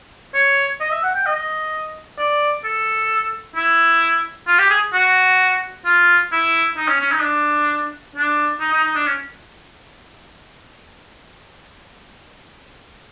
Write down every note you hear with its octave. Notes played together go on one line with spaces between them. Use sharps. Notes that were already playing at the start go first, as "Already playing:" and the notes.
C#5
D#5
E5
F#5
G5
D#5
D5
A4
E4
F4
G4
G#4
F#4
F4
E4
D#4
C#4
C#4
D#4
D4
D4
D#4
D#4
D#4
D4
C#4